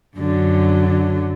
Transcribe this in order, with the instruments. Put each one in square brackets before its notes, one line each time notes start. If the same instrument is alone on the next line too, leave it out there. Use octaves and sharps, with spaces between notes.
[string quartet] F#2 D3 F#3